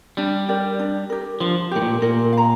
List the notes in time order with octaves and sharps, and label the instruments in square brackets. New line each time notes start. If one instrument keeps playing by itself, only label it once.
[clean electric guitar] G3 [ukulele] D4
[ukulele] G4 A#4 D5
D4
G4 A#4
[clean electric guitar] F3 [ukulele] D4
[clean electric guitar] A2 [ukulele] G4 A#4
[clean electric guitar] A#2
[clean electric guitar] A#2 [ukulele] A#4
[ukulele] F5 A#5